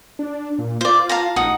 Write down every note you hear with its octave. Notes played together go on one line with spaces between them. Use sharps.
D4
A#2
F4 C5 D5
F5 A5 A#5
A1 D#4 F#5 D#6